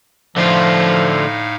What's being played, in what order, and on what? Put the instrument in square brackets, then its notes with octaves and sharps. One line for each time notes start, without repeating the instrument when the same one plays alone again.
[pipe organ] A2 D#4 F5 [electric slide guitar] D3 A3 F4 [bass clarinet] F3